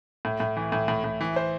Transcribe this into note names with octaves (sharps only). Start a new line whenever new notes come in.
A2
A2
E3
A2
A2
A2
E3
C5